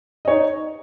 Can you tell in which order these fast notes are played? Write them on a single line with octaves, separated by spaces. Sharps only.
D#5 C#5 D#4